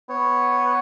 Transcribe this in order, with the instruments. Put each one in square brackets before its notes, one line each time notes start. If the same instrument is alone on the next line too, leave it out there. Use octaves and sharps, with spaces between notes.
[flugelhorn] B3 [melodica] C#5